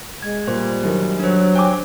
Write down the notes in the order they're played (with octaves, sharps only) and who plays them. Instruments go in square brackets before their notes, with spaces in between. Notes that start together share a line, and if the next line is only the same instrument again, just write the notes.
[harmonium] G#3 [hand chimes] G#6
[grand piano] A#2 [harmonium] G3 [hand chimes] C5
[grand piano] F#2 D#3
[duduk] F#3 [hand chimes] D4 C5
[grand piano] G5 G#5 D6